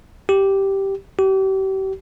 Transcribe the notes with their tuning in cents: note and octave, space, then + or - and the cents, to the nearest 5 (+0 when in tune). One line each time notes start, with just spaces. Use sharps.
G4 -5
G4 -35